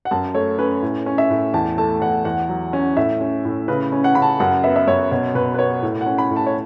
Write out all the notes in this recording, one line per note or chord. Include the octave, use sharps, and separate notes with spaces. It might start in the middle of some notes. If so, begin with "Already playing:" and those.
F#5
F#2 A5
A3 C#5
C#4 B4
A2
C#4
E5
A2
E2 A5
A3 A5
E2 F#5
E2 F#5
F#3
C#4
A2 E5
C#4
A2
C#3 B4
C#4
F#5
C#3 B5
A5
F#2 F#5
B3 E5
E5
F#2 C#5
B2 C#5
B2 B4
B4
B3 C#5
A2
F#5
C#4
B5
A2
A5
C#5